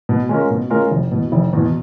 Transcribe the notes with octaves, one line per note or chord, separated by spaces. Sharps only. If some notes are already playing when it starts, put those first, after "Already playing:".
B2
G#3 C#4 F4 A#4
B2
G#3 C#4 F4 A#4
F1
E2 B2
F1
E2 B2